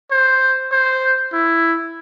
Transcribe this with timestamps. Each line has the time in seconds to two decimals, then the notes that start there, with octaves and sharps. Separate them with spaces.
0.11 C5
0.72 C5
1.33 E4